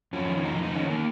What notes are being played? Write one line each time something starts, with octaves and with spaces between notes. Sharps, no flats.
F2 C#4
D#3
F2 D#4
F2 D#4
D#3 C#4
A#3